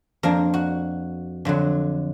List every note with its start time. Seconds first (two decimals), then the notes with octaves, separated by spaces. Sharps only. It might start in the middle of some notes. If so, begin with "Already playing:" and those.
0.23 F2 F3 A#3 D4 A#4
0.54 F#4
1.45 F2 D3 F#3